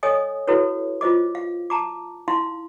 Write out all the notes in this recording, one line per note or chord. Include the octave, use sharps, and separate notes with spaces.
A4 C#5 D#5 G#5 D#6
E4 F#4 A4 B4 C#5
F4 C5 D#5 D6
F5
A5 A#5 D6
D#4 E4 F5 C6